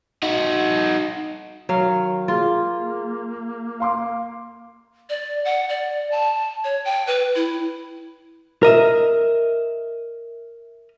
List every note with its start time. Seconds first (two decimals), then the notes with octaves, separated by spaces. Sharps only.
0.23 D#4 F#4
1.69 D#3 F#3 F5
2.28 A#3 F4 G#4
3.80 F5 C6 D6
5.10 D5
5.45 F#5
5.69 D5
6.12 A5
6.64 C#5
6.85 G5
7.07 B4
7.36 E4
8.63 A#4 D#5 E5